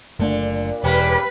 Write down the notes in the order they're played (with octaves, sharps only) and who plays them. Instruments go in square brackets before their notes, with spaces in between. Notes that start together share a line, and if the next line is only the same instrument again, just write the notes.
[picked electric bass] F#1 A3 D4 [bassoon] A#2 [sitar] D3
[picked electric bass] E1 [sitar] E2 A#3 C#4 [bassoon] G4 [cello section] B4